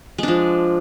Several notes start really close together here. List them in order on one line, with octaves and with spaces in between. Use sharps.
G#3 D4 F3